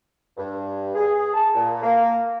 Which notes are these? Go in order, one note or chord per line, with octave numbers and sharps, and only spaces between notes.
G2
G#4
A5
A#2
A#3